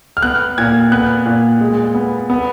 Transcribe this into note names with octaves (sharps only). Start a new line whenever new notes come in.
F6
B3 F#6
A#2 G#6
B3 F#6
A#2
G#3
B3
B3